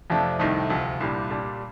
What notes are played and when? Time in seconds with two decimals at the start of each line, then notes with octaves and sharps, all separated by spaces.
0.10 F2 C3 F3 A3 D4
0.39 C2 C3 D#3 A3 D#4
0.70 D2 C3 F3
1.00 C2 A#2 G3 D4
1.31 A#2 G3 D4